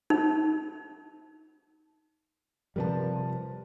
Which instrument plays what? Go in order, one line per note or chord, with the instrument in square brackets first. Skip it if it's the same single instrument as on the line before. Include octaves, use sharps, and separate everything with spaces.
[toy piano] D#4
[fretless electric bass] C3 F3 G3 [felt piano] A#4 B4 A5